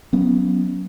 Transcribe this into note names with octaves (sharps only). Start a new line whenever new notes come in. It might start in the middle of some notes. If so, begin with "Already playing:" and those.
F#3 B3 C#4